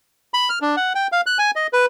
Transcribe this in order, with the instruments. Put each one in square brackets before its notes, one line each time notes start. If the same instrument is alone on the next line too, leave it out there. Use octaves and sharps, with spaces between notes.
[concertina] B5
F6
D4
F#5
G5
F5
F#6
G#5
D#5
B4